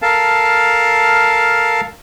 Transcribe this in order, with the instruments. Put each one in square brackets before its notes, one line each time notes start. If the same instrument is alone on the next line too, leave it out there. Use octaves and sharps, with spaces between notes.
[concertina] A4 A#4 F5 A5